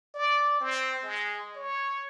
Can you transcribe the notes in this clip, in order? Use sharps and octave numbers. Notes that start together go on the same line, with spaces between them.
D5
C4
G#3
C#5